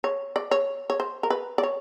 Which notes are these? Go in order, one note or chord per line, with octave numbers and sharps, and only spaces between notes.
C#5
D5
C#5
C#5
C5
A#4
B4
D5
C#5